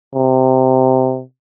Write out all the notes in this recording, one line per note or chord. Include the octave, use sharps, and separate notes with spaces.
C3